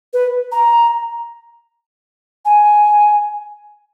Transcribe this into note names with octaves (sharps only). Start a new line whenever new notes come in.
B4
A#5
G#5